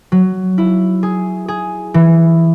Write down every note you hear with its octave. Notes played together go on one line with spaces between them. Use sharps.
F#3
E4
G#4
G#4
E3